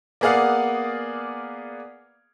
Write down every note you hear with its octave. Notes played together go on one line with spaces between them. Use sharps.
A#3 B3 G#4 D5 F5 F#5